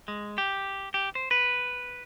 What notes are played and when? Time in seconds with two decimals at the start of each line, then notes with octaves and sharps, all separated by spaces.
0.08 G#3
0.38 G4
0.94 G4
1.15 C5
1.31 B4